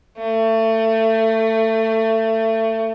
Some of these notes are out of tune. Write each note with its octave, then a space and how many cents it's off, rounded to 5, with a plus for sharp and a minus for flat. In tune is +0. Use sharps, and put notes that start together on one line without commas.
A3 +25